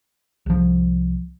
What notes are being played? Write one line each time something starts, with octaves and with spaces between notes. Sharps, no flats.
C2 F3